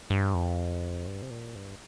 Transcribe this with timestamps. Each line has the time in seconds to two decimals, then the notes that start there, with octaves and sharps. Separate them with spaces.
0.10 G2
0.35 F2
1.07 G2
1.22 C3
1.30 A#2
1.55 G2